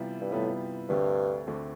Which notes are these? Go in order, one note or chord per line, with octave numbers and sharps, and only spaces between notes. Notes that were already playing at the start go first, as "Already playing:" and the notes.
Already playing: C3 E3 G3 B3 F4
G2
A2 C3 E3 G3 B3 F4
D2 G2 D3 A3 C4
D2 D3 A3 C4